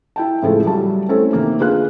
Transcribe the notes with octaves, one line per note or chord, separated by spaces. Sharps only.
E4 G5 A5
A2 C#3 F3 G#3 E4 A4
F#3 G3 A5
A3 C4 C#4 E4 A4
C3 D#3 A#3
D3 F4 G#4 B4 F5 F#6